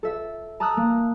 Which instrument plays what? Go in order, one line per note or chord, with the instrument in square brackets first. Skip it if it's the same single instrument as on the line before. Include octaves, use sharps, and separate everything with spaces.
[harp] A4 E5
A5 A#5 D#6 E6 F#6
A#3